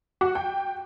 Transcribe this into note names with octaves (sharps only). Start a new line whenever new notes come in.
F#4
G5